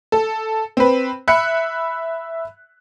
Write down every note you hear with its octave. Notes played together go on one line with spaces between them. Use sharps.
A4
C4 B4
E5 B5 F#6 C#7